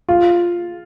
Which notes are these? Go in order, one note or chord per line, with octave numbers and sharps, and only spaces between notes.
F4